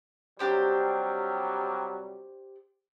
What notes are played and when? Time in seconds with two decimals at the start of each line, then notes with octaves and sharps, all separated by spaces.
0.39 C3 F#3 G3 D4 G4 C5